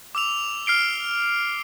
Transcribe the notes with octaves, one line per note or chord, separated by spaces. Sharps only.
D6 E6 F7
F6 C7 D7 G7